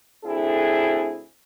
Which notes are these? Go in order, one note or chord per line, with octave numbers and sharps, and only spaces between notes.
D2 C4 D4 E4 G#4 A4